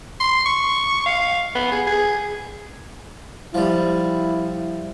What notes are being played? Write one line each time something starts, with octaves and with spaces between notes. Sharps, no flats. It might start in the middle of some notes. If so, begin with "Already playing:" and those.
C6
C#6
F5
B3
G#4
G#4
F3 G3 E4